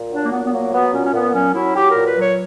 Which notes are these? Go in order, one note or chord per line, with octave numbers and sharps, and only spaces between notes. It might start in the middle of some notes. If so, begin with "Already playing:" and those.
Already playing: A#2
F#3 D4
A#3
A#2 B3
B3
F#3 A#3
F#3 B3
A#2 C#4
C#4
A#2 B3
F#3 C#4
F#3 E4
F#3 G4
A#2 A#4
B4
F#3
C#5